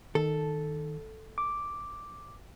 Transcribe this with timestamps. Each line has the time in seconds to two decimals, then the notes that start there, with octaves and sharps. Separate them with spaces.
0.15 D#3 A4
1.38 D6